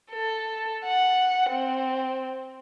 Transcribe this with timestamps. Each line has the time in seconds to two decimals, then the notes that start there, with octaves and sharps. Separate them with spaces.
0.11 A4
0.84 F#5
1.50 C4